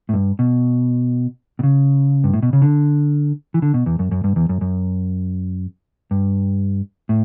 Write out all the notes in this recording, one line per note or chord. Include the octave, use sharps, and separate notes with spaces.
A2
G2
B2
B2
C#3
G2
A2
B2
C#3
D3
E3
D3
B2
E2
F#2
F#2
G2
E2
F#2
F#2
G2
A2